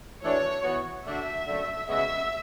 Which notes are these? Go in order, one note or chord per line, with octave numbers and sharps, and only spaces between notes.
E3 A3 D4 F#4 C#5
E3 B3 F#4
D3 A3 D4 F#4 E5
F#2 D3 A3
C#3 G#3 B3 F#4 E5